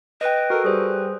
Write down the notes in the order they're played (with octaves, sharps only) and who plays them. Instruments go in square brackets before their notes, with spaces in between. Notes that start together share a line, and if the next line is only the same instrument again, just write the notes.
[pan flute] B4 [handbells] D#5 G5
[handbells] F#4 A4 [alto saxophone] A#4
[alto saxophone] G3 [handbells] G#4 C5